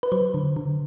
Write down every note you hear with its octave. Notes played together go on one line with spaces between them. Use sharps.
B4
F#3 C5
D3
D3